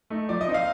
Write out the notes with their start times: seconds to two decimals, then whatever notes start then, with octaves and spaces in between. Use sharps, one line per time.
0.10 A3 D#4
0.29 F3 D5
0.41 D#5
0.48 C4 D#4
0.54 F5